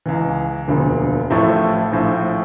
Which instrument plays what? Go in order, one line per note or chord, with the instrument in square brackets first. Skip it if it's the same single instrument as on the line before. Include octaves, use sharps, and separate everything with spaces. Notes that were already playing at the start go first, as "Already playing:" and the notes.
[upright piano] C#2 C#3 E3
E1 D2 D3 F3 A#3
A1 A2 F3 A3 E4
A#1 A2 F3